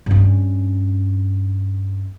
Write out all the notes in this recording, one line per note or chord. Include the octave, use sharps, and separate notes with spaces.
G2 C#4